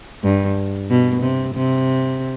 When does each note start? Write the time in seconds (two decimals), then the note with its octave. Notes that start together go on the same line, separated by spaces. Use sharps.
0.24 G2
0.90 B2
1.22 C3
1.55 C3